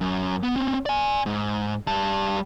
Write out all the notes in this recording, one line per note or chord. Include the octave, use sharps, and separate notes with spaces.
F#2
B3
C4 C#4
D5 G#5
G#2
G3 A5